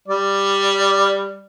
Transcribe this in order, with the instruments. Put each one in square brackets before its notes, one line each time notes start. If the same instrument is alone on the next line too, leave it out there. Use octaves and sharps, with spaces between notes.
[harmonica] G3 D5